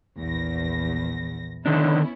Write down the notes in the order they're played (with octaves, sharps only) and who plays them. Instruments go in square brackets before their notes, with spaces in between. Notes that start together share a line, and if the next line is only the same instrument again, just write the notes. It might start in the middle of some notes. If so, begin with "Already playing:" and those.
[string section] A#1 E2 A#6
[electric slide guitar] D3 D#3 D4 [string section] B3 C#4 E4